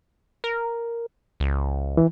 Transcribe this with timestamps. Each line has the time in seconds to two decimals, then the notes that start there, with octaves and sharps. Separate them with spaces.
0.44 A#4
1.40 C#2
1.97 E3